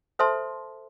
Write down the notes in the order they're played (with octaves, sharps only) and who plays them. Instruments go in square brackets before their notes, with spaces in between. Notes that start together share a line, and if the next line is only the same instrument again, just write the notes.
[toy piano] A4 C5 E5 A5 C6